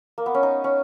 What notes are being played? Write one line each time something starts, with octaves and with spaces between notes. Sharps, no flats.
A#3
B3
C#4
D#4
C#4